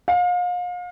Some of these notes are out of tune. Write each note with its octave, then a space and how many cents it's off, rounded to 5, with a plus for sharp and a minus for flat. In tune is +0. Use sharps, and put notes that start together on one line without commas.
F5 +35